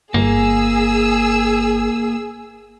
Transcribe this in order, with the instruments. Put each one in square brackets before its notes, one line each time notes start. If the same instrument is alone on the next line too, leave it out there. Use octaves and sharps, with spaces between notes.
[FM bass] G1 [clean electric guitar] A#3 [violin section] G#4 E6